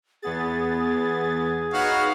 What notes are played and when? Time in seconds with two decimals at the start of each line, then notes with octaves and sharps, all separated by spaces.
0.23 E2 B3 G#4 A6
1.73 D#4 F#4 B4 C#5 F5 F#5